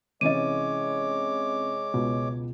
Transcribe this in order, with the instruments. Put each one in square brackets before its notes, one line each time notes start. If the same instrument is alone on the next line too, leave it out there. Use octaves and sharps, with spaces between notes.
[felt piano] C3 E3 C#4 [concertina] G#3 C#5 D6 [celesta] D#5 D#7
[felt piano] C#2 B3 [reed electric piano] B2